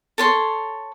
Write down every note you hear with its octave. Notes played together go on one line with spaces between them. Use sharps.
A4 C#5 C6